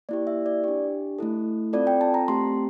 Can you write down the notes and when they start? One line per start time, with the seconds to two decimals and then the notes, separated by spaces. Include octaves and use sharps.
0.09 A#3 E4 G4 D5
0.27 E5
0.46 D5
0.64 D4 G4
1.19 A3 E4 A4
1.73 C4 F4 A4 D5
1.87 G5
2.01 A5
2.14 A#5
2.28 A3 C4 G4 C6